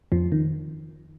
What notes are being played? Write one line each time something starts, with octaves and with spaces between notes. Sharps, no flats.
F2 F3
D#3